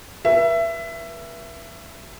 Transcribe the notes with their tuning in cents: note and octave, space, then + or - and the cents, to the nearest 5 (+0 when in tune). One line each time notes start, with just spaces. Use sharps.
B4 -45 E5 +20